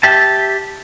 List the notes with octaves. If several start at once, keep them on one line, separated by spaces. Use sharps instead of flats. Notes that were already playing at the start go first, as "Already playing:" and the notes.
G4 E5 A5